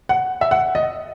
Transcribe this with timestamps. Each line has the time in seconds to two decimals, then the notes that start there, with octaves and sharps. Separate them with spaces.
0.09 F#5
0.41 E5
0.51 F#5
0.75 D#5